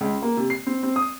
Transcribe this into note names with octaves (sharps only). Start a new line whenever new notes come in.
C#2
A#3
C3
C7
C4
C4
D#6